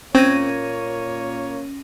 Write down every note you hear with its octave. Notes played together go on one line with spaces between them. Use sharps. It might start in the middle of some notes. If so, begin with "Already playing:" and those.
A#2 A#3 C4 C#4 C#5 A#6 D#7